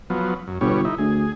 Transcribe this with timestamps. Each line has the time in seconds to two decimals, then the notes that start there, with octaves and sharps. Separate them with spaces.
0.10 F3 F#3 B3
0.47 F#2
0.61 G1 B2 G3 C#5
0.85 D#4 E4
0.98 D2 G#4